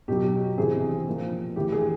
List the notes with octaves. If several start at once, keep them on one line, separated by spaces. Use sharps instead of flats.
B2 F#3 G4
C3 E3 G#4
A#2 F3
A2 E3 G4
G#4